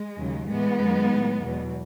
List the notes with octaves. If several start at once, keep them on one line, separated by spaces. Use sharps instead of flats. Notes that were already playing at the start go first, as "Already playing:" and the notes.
Already playing: G#3
D#2 C#3 F#3
A2 E3 G#3 B3
F#2 D#3 F#3
A2 F#3
E2 B2 F#3